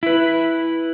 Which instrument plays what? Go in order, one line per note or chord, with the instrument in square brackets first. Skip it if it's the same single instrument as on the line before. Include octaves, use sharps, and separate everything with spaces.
[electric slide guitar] E4 B4